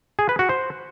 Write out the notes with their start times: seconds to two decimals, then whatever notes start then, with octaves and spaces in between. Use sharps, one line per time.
0.19 G#4
0.29 B4
0.39 F#4
0.49 C5